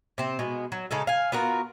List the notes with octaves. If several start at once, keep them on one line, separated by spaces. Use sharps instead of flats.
C3 C4
B2 G#3 B3
F#3
C#3 G#3 D#4 A4
F5 G#5
B3 F4 F#4 A#4